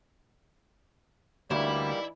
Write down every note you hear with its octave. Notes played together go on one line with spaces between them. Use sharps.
D2 E3 G3 A#3 D#4 E4 G4 D5